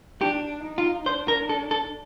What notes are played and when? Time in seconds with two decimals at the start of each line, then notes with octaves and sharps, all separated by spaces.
0.21 D4 G4
0.63 D#4
0.78 F4
1.06 D4 C5
1.28 A#4
1.49 A4
1.71 A4